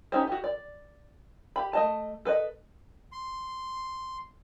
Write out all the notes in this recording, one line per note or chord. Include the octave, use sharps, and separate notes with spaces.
C#4 D#4 E4 G4 C5
F#4 G4
D5
G4 B5
A3 D#5 A5
A4 B4 D5 D#5
C6